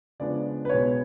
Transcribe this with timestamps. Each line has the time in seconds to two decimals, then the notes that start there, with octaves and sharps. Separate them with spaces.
0.20 C#3 F3 G#3 B3 D4 D5
0.65 B4
0.69 B1 B2 G#3 B3 C#5